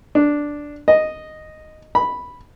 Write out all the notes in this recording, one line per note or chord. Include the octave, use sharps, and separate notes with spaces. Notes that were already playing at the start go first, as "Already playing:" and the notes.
D4
D#5
B5